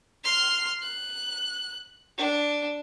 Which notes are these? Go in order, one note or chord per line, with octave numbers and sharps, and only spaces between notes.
C6 F6
F#6
D4